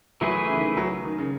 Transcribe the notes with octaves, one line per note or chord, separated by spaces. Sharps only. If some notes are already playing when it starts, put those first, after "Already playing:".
E3 F#3 A3 E4 G#4 B4
C#3
D#3
C#3
F#3
D#3
C#3